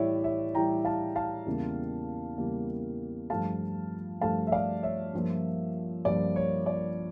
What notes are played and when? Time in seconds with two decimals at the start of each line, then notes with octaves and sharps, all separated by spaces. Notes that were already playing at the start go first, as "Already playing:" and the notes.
Already playing: A2 E3 G3 C#5 D5 E5
0.24 C#5 E5
0.54 A2 E3 G3 G5 A#5
0.85 F5 A5
1.16 F5 A5
1.46 E2 C#3 G3 A#3
2.38 E2 C#3 G3 A#3
3.30 G2 F3 A3 F5 A5
4.21 G2 F3 A3 F5 A5
4.47 E5
4.52 D5 F5
4.83 C#5 E5
5.13 G2 F3 A#3
6.05 G2 F3 A#3 D5
6.36 C#5
6.66 D5